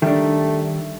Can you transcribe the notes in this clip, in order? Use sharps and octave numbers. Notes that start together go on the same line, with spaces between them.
D#3 G3 A3 D4